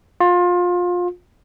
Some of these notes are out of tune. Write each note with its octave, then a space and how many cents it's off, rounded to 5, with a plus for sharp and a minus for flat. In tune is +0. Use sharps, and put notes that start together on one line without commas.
F4 +25